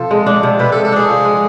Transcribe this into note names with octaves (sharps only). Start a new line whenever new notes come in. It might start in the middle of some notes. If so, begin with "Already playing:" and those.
Already playing: C3 F3 A4
G#3
D4
C3
C3 B4
A4
G#3
A4
D4 G#4
F3
G#3